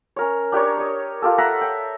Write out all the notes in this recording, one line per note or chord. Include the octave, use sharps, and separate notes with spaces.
C#4 A#4 C#5
D4 G4 A#4 C#5
D#5 C#6
F4 G4 A4
A4 E5 F#5 A#5
G5